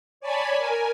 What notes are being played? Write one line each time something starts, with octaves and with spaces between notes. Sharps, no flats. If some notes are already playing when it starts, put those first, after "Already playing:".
C#5 D5 G#5 A5 B5
A#4 G#5